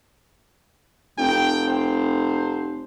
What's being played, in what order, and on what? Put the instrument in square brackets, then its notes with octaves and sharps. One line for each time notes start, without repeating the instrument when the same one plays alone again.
[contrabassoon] F1 [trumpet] G5
[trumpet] C5